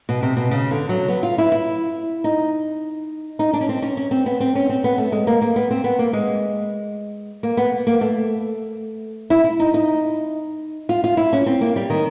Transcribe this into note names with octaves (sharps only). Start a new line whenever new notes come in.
B2
C3
B2
C#3
D3
F#3
B3
F4
E4
E4
D#4
D#4
D4
C#4
C4
C#4
C#4
C4
B3
C4
C#4
C4
B3
A3
G#3
A#3
A#3
B3
C4
B3
A#3
G#3
A#3
B3
A#3
A3
E4
E4
D#4
D#4
F4
F4
E4
C#4
C4
A#3
G3
D#3